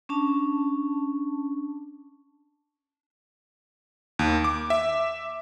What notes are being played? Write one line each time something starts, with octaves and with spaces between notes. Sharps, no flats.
C#4 D4 A5
D#2
D6
E5